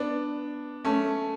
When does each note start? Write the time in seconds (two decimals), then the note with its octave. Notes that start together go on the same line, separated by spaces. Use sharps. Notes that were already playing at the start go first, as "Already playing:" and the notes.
Already playing: B3 D4
0.85 A3 C#4